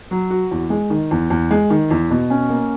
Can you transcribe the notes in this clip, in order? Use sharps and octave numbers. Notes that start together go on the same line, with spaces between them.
F#3
F#4
E2
G#3
D#3
E2
E2
G#3
D#3
E2
B2
C#4
A#3